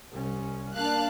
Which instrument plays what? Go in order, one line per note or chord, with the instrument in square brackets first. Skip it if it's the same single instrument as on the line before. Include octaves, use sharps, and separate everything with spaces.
[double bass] C2 C#4
[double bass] A#3 D4 [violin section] F5 A5 F#6